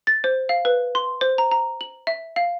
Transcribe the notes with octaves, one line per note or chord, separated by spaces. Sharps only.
A6
C5
F5
B4
C6
C5
A#5
A#5
F#7
E5
F5